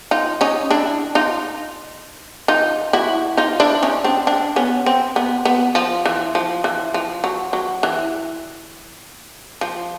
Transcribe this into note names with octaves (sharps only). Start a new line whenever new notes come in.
D#4 F4
C#4 D#4
D4 E4
D#4 F4
D#4 F4
E4 F#4
D#4 F4
D4 E4
C#4 D#4
C4 D4
C4 D4
B3 C#4
C4
B3
B3
F3
E3
F3
E3
F3
F#3
F#3
E3
F3